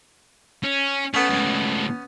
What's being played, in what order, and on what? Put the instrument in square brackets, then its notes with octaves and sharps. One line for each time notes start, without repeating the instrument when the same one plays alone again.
[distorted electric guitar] C#4
[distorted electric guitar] A3 [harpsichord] B3 C#4
[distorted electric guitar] C#2 A2